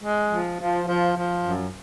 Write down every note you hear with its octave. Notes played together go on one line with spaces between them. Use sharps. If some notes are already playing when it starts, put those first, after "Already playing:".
G#3
F3
F3
F3
F3
F#2